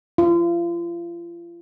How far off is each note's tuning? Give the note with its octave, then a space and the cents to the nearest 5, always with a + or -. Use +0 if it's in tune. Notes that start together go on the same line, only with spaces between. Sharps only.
F4 -35